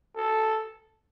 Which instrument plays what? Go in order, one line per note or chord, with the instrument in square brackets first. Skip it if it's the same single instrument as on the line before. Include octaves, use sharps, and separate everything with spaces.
[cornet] A4